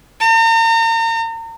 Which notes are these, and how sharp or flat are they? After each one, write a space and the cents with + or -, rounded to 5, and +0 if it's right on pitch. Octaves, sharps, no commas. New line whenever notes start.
A#5 -40